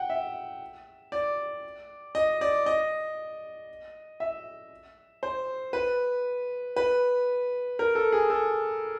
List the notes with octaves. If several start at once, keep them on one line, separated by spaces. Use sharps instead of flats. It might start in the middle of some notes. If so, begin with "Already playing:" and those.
Already playing: F#5 G5
E5
D5
D#5
D5
D#5
E5
C5
B4
B4
A#4
A4
G#4
A4